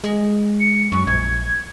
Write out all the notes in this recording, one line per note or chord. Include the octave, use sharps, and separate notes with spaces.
G#3
C#7
F#2 C#6
A#1 G#6